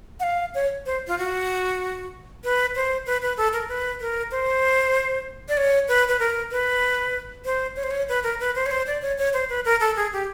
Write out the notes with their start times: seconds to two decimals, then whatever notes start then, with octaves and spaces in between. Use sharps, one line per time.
0.20 F#5
0.23 F5
0.55 C#5
0.86 C5
1.07 F4
1.18 F#4
2.44 B4
2.75 C5
3.06 B4
3.22 B4
3.37 A4
3.53 A#4
3.69 B4
4.00 A#4
4.31 C5
5.49 D5
5.57 C#5
5.88 B4
6.08 B4
6.19 A#4
6.51 B4
7.45 C5
7.76 C#5
7.83 C5
7.91 C#5
8.09 B4
8.23 A#4
8.40 B4
8.55 C5
8.66 C#5
8.71 C5
8.87 D5
9.02 C#5
9.18 C#5
9.33 C5
9.49 B4
9.65 A#4
9.80 A4
9.96 G#4
10.13 G4